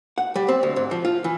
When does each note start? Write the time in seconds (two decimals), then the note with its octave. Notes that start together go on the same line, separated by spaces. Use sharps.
0.18 F#5
0.36 G3
0.48 C4
0.63 D2
0.76 G#2
0.91 F3
1.05 F4
1.24 E3